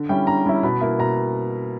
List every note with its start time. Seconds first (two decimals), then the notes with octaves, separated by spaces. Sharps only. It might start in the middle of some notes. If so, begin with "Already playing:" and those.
Already playing: D3
0.09 G3 C#4 E4 G5
0.27 D3 A#5
0.46 G3 C#4 E4
0.63 B2 B5
0.81 A#3 E4
0.99 B2 A#5